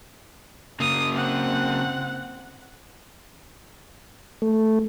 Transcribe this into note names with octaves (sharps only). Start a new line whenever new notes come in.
C#3 A#3 D#6
C4 F#5
A3